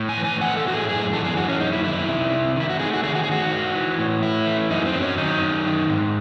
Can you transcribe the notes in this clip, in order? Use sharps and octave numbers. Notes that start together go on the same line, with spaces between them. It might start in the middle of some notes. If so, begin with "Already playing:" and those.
Already playing: A2
G#5
E3
G#5
A3 F#5
A4
A2 F#4
G#4
F#2 G#4
E3 A4
G#4
F#2 F#4
C#4
F#2 D#4
E4
D#3 E4
C3
C3
D#3 E4
F#4
A3 G#4
F#4
D#3 G#4
F#4
G#4
D#3 F#4
D#3
E3
A2
A3 E4
E3
F#2 D#4
C4
F#3
C#4
D#3 D#4
F#2
D#3
G#2